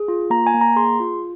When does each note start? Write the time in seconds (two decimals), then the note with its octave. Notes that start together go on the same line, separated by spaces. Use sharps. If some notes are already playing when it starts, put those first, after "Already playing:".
Already playing: G#4
0.08 F4
0.30 A#3 A#5
0.47 G#5
0.54 A#3
0.61 A#5
0.76 G#4 C6
1.00 F4